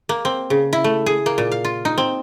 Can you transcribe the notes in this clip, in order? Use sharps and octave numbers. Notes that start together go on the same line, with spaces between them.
A#3
C4
C#3
E4
A3
G#4
A#3
A#2
F5
F4
D#4
C4